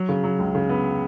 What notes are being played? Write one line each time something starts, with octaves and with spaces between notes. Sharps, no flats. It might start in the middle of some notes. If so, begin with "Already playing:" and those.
Already playing: F#3
C#3
F#3
C#2
C#3
B3